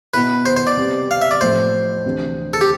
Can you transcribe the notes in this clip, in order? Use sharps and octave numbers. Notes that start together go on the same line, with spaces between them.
B2 B3 E4 B4
C5
C5
D5
C3 G3 B3
F5
E5
D5
A1 A2 F3 C5
D2 C3 E3 G3 D4
A4
G4